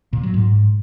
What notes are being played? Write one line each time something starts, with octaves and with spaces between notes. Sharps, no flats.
A#2
F#3
G#2